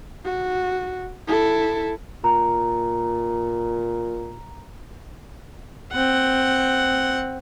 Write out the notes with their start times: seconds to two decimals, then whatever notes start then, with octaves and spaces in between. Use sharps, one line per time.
0.25 F#4
1.28 E4 A4
2.24 A#2 A#5
5.92 C4 F#5